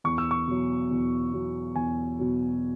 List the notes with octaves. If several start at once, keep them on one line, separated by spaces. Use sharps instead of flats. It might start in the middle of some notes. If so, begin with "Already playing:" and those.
E2 C#6
E6
C#6
B2 F#3
E2
B2 F#3
E2 G#5
B2 F#3